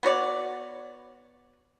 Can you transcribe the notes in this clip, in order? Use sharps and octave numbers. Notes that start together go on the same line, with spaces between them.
B3 F#4 C#5 D5